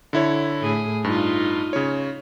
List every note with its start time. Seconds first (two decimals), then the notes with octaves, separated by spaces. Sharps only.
0.13 D3 E4 C#5
0.61 A2 G#4
1.04 G2 D#4 F4
1.73 C#3 C#5